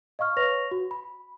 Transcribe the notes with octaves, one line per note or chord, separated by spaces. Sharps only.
D#5 F5 C#6 F6
B4 C#5 C#6 A#6 F7
F#4
B5